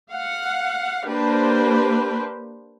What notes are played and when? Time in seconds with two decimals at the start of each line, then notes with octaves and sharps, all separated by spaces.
0.11 F5 F#5
1.06 A#3 D4 G4 B4 C5